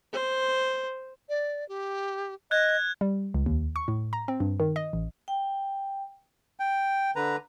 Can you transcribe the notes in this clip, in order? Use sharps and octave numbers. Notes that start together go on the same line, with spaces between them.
C5
D5
G4
D#5 F#6 G#6
G3
C#2
D#2
C#6
A2
A#5
C4
G2
D#3
D#5
A1
G5
G5
D3 B4 A#5